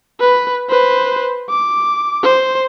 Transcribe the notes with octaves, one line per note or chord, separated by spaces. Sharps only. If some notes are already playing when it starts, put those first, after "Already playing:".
B4
B4 C5
D6
C5